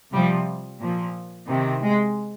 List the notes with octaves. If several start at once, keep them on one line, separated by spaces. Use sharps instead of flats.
C3 F3 G3
A#2 F3
C3 D#3
G#3